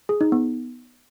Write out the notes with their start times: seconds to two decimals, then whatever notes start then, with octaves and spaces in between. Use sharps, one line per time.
0.09 G#4
0.21 D#4
0.32 B3